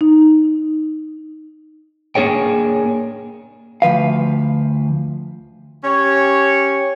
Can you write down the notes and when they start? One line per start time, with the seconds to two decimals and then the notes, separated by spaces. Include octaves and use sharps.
0.01 D#4
2.15 A#3 D4 G#4 C#5 G5
3.82 D2 F3 B4 F5
5.84 C#4 G4 C#5